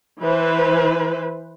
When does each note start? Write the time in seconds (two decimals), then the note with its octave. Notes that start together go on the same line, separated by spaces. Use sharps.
0.23 E3 B4 C5